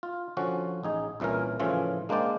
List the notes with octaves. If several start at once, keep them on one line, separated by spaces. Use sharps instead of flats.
F4
D3 F3 C#4 F#4
A1 D#4 G#4
C2 A#2 E3 C#4 A#4
A2 C#3 E3 F3 C#4 F4
G#3 A#3 D4 C5 D5 G5